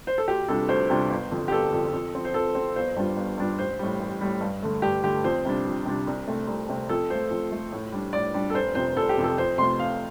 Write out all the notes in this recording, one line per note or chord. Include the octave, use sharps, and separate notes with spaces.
C5
A4
D2 G4
C3 G3 D4 F4 A4
D2 C5
C3 G3 D4 F4
G1
F2 D3
G4
G1 A4
F2 D3
F2
F3 C4
C5
F2 A4
F3 C4
G1 C5
G2 G3 D4 F4
G1
G2 G3 D4 F4
A1 C5
A2 G3
A1
A2 G3
G2
D3 A3
G2 G4
D3 A3 G4
F2 C5
C3 G3 D4
F2
C3 G3 D4
C2
C3 A3 C4
C2
C3 A3 C4
F2 A4
F3 A3 C5
F2
F3 A3
A2
G3 D4
A2 D5
G3 D4
A4
F1 C5
F2 C3 C5
F1 A4
G4
F2 C3
A4
F2 C5
C3 A3 F4 C6
F2 F5